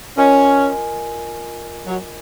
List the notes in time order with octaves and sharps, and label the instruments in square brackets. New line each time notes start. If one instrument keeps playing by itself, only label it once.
[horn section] C#4 [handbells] F4 A#4 D#5 G#5
[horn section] F#3